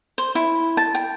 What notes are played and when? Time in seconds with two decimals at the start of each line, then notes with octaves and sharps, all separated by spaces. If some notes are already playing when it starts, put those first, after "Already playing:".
0.18 C5
0.35 E4
0.77 A5
0.95 G5